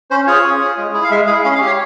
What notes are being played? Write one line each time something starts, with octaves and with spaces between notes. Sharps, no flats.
C#4 C5
F4 G#4 C#5
C#4
F4 G#4
G#3
E4 G#4
F5
G#3 E5
E4 G#4 F5
C#4 F5
F5
G4
C#5